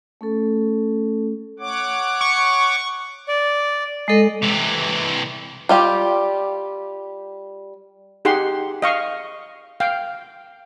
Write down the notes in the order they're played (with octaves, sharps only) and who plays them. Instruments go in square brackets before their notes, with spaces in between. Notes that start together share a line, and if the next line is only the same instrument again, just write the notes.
[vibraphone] A3 C#4 A4
[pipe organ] C#5 F#5 D6
[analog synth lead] C#6
[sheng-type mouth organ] D5
[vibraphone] G#3 A4 [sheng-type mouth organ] D#5
[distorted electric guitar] C3 E3
[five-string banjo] G3 F4 G4
[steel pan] D#4 G4 G#4 F#5 C6
D#5 F5 C#6
F5 G5